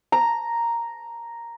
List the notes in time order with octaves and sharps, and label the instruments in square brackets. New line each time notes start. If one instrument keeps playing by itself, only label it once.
[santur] A#5